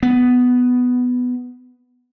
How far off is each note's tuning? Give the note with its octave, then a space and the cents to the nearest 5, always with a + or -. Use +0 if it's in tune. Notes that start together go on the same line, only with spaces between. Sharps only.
B3 +5